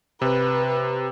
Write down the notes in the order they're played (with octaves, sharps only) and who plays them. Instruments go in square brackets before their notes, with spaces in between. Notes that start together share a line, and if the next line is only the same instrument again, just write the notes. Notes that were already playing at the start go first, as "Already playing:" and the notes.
[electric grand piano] C3 [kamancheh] B4